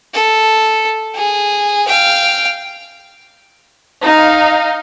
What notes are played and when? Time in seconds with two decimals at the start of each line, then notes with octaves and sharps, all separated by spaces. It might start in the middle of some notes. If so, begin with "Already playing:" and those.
0.14 A4
1.15 G#4
1.87 F5 G5
4.04 D#4 F5